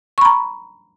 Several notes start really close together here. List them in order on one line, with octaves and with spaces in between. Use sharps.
C#6 B5 A#5